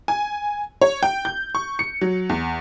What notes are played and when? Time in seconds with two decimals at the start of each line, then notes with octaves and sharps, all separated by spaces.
0.08 G#5
0.82 C#5
1.03 G5
1.25 G6
1.55 C#6
1.79 C#7
2.01 F#3
2.29 E2